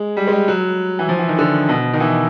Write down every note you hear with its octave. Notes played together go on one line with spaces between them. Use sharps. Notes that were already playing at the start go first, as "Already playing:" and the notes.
Already playing: G#3
G3
G#3
G3
F#3
E3
F3
E3
D#3
D3
B2
D#3
E3